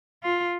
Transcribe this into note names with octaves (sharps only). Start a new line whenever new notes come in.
F4